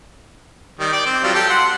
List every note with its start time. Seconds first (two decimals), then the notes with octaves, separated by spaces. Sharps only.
0.80 D#3 G3
0.92 D5 G5
1.06 C4
1.23 F#3 G3 F4
1.35 G4 A4
1.50 F#5 C6